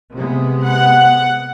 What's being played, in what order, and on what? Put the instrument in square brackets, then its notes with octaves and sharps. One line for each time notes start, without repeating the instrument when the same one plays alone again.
[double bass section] C3 G#3 B3
[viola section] F#5